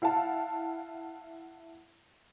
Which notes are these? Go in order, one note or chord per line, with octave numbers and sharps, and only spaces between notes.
E4 F5 F#5 A5